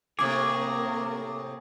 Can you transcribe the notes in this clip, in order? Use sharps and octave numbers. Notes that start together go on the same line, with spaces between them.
A2 C3 A#3 G#4 A#4 D6